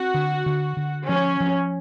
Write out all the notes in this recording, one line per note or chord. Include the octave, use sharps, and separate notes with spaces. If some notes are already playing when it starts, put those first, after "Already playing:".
Already playing: C4 F#4
D3
D3
D3
F3 C#4
F3